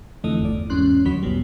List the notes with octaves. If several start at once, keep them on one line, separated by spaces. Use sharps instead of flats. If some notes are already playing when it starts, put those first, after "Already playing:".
F2 D3 E3 A3 D#5
G1 E2 D5
E2 G#2 C#4 C6 F#6
D2 D#3 F#3 C#5 B5 B6
A1 E2 B2 G3